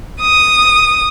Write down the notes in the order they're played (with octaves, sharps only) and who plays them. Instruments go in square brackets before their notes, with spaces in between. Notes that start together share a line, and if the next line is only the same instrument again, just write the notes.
[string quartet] D#6